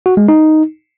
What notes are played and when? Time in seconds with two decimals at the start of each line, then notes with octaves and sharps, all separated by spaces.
0.06 F#4
0.17 G#3
0.29 D#4